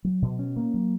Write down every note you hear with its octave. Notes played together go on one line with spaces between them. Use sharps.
F#3
B2
C#4
A#3
F#3